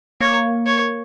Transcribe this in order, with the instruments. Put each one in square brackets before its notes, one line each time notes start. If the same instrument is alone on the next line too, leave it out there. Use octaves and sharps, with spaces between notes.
[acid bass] A#3 [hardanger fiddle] C#5
[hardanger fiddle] C#5